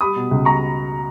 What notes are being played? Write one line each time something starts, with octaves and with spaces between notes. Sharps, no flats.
G3 B5 D#6
B2
C#2
A#5 C#6